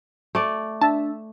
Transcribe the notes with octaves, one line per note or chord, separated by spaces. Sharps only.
A3 D5
D4 E5 A5